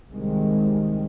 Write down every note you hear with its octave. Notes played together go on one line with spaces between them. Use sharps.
C2 C3 D#3 G#3